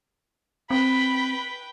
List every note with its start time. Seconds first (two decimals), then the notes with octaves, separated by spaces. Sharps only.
0.70 C4 B4 G5 B5